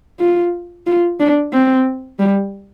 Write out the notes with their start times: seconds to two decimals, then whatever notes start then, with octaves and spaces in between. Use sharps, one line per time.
0.20 F4
0.86 F4
1.20 D4
1.53 C4
2.19 G3